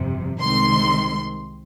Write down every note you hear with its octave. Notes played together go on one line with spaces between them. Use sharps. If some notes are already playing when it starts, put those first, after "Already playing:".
Already playing: G1 F2 C3
C2 C3 D#3 G#3 C4 C6